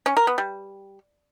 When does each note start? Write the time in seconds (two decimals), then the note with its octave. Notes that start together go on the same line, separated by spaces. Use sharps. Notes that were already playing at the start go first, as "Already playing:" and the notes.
0.06 C#4
0.17 A#4
0.27 B3
0.38 G3